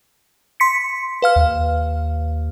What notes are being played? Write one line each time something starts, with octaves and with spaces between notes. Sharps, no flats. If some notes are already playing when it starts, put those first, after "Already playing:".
C6 B6 C#7
B4 F5 F6
D#2